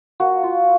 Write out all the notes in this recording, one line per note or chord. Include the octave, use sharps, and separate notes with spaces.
A#3 F#4
F4